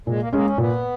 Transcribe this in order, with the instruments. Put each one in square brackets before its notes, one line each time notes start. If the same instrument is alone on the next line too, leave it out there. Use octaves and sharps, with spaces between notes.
[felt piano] A#2 [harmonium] G#3
[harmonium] A#3
[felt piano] G#3 C#4 [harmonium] A#3
[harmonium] C#4
[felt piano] A#2 [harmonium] B3